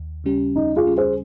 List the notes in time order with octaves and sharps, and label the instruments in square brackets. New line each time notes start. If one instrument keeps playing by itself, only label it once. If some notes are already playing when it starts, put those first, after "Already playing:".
Already playing: [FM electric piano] D#2
C#3 G3 C#4 G4
[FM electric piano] D#2 [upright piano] D#4
[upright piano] F4 G#4
[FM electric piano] C#3 G3 C#4 G4
[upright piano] G#4 C5